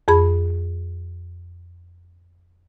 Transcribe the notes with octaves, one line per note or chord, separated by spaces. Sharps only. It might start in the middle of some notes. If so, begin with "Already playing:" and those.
F2 G#4 B5